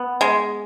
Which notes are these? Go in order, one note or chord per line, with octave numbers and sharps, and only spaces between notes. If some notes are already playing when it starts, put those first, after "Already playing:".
Already playing: B3
G#3